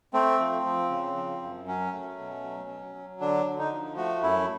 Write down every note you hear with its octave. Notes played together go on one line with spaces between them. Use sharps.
A3 C4
F3
F3
C#3
F3
F#2
F#3 C#4
A3
B2
F#3
F#3
F#3
D3 D4
D3
D#4
F3
A3 F#4
F#2 E4